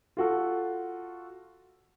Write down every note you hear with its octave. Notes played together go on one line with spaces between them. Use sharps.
F4 F#4 A4